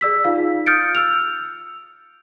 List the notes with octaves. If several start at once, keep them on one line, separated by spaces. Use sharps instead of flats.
G#4 D5 E6 B6
D#4 F4 F5
D#6 F6 G6 A6 C#7 D7
E6 F6 F7